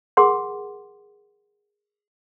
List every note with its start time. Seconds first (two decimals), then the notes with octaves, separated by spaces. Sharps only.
0.17 G#4 A#4 F#5 C6 D6